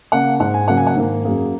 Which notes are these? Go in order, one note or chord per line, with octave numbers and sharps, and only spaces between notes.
C#3 A#3 F#5
G#2 G#3 F#5
G#5
C#3 F#3 A#3 F#5
G#5
F#5
G#2 D#3 A#3
F#2 F#3 A#3 G#4